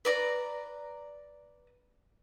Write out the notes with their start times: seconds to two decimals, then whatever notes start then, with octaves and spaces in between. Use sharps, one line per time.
0.05 B4 D5 A#5